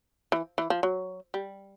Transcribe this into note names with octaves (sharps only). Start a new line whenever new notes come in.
E3
E3
F3
F#3
G3